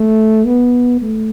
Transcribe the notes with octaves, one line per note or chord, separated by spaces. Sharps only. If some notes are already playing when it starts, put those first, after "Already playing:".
Already playing: A3
B3
A3